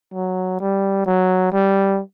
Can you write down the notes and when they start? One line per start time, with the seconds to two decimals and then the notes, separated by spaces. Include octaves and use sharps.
0.13 F#3
0.60 G3
1.06 F#3
1.52 G3